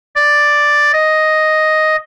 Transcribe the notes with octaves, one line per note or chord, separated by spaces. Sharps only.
D5
D#5